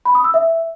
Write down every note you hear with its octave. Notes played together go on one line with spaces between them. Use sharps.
B5
D#6
E6
E5